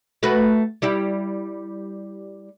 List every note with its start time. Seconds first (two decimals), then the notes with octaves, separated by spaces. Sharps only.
0.23 A3 F#4 B4
0.82 G3 E4 G4